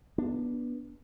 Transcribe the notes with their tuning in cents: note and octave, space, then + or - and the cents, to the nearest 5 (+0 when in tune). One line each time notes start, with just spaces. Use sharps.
B3 -20 D4 +0